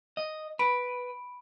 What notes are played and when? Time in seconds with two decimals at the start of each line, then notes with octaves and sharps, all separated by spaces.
0.17 D#5
0.59 B4 B5 D7